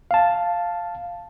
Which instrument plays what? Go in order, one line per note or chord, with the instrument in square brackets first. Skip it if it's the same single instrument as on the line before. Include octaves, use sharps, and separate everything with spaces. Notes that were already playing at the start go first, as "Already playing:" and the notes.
[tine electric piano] F5 A5